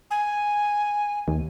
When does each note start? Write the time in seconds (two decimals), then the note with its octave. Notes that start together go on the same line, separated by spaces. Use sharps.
0.11 G#5
1.28 D#2